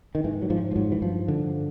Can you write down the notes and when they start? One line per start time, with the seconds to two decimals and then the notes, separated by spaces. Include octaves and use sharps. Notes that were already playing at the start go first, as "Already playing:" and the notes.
0.15 D#3
0.24 G#2 E3
0.42 F#3
0.50 G#2 F3
0.71 F3
0.76 G#2 F#3
0.92 E3
1.02 G2 F3
1.28 D3